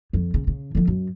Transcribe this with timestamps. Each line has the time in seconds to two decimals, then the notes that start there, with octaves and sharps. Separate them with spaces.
0.13 F2
0.34 C#3
0.47 C#3
0.75 D3 F3
0.87 F#2